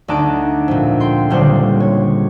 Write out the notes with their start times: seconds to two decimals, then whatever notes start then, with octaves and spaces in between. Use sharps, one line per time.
0.08 D2 D#4 D5 A5 F#6 D7
0.68 F2 A#2
1.00 G5 C6
1.30 D#1 C#2 D3 G3 C5 F#5
1.80 C#5